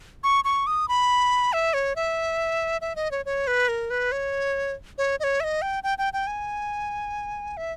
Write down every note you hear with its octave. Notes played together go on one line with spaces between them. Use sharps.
C#6
C#6
D#6
B5
E5
C#5
E5
E5
D#5
C#5
C#5
B4
A#4
B4
C#5
C#5
D#5
C#5
E5
D#5
G5
G5
G5
G5
G#5
E5